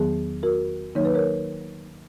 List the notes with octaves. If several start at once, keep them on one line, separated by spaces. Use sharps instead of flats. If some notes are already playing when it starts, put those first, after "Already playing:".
Already playing: E2 D#3 F#3 B3 G#4
F#4 A#4
D#3 F#3 A#3 D#4 C#5
B4
A#4 C#5